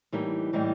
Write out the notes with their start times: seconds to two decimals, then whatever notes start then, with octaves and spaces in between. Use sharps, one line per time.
0.12 A2 E3 G3 A#3 D#4
0.53 A2 E3 G3 A#3 D#4